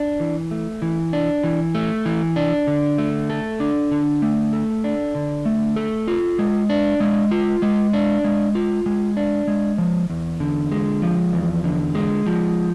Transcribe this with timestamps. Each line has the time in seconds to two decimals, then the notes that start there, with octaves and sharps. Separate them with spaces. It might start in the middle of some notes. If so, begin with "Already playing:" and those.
Already playing: D4
0.20 E3
0.51 A3
0.82 E3
1.13 D4
1.44 E3
1.75 A3
2.05 E3
2.36 D4
2.67 D3
2.98 A3
3.30 A4
3.60 D4
3.91 D3
4.22 A3
4.53 A4
4.84 D4
5.15 D3
5.46 A3
5.76 A4
6.08 F4
6.39 G#3
6.69 D4
7.00 G#3
7.31 F4
7.62 G#3
7.93 D4
8.24 G#3
8.55 F4
8.86 G#3
9.17 D4
9.47 G#3
9.78 F3
10.10 E2
10.40 D3
10.72 G#3
11.02 F3
11.33 E2
11.64 D3
11.95 G#3
12.26 F3